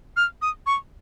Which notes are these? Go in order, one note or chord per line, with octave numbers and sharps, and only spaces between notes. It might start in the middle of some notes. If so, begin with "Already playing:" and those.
F6
D#6
C#6